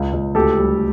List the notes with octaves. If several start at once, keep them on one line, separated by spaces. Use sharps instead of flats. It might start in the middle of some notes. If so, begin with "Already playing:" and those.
Already playing: C#2
C#2
D2 G4 A4
G3